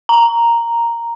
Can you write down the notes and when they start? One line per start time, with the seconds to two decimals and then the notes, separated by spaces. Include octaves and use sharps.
0.09 A#5